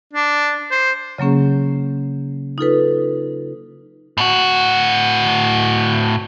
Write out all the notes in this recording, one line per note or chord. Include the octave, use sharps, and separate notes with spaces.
D4
C5
C#3 F#3 A#3 C#4 G#4
D#4 F4 A4 B4
A2 F#4